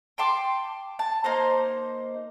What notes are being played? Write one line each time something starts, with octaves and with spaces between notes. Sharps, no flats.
G5 A5 C6 D6
A5
A#3 D#4 C5